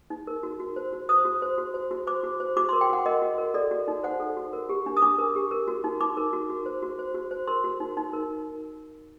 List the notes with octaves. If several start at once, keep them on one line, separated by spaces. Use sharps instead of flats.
D#4
A#4
F#4
F#4
C5
F#4
C5 D#6
F#4
C5
F#4
C5
F#4
C5 D6
F#4
C5
F#4 D6
C6
A#4
G5
F#4 F#5
A#4 D#5
F#4
A#4
A4 D5
F#4
D#4
C5 F#5
A4
F#4
A#4
G4
D4
D#6
D4 D6
A#4
G4
A#4
F#4
D#4
D#4 D6
A#4
F#4
F#4
C5
F#4
C5
F#4
C5
A#4 C6
F#4
D#4
D#4
A#4